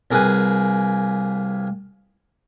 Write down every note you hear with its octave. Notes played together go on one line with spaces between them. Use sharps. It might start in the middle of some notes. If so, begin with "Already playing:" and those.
C2 A#3 G#4 B4 G#5